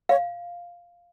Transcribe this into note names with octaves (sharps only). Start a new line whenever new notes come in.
C#5 F5